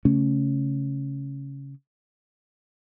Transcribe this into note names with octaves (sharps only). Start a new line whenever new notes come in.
C#3 A3 C#4